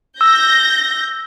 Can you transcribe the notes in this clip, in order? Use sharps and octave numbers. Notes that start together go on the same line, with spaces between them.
E6 G6 A#6